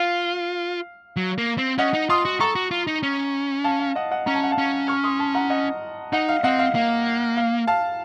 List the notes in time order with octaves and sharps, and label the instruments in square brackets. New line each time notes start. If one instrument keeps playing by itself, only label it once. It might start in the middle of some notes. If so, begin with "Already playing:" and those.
Already playing: [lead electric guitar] F4 [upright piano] F5
[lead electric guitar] F#3
A#3
C4
[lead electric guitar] C#4 [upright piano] D#5 F#5
[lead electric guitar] D#4
[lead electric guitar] F4 [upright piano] C6 D#6
[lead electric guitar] F#4
[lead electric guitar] A4 [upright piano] A#5 C#6
[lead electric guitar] F#4
F4
D#4
C#4
[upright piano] F5 A5
F5
D#5 F#5
D#5 F#5
[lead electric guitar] C#4 [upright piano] A#5
[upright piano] A5
F#5
F5 A5
[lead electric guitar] C#4
[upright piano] C#6 F6
C6 D#6
A5 C6
F#5 A#5
D#5 F#5
[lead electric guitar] D#4 [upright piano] D#5 F#5
[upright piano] F5
[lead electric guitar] C4 [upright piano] D#5 F#5
[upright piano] F5
[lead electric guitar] A#3 [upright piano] F5
[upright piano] F5
F5 A5